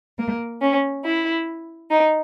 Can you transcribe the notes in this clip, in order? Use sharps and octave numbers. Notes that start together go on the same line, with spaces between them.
A#3
C#4
E4
D#4